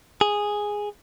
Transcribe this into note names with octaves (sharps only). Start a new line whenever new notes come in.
G#4